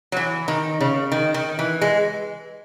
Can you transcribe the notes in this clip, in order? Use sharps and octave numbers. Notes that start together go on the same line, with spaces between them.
F#3
E3
D#3
C#3
D#3
D#3
E3
G#3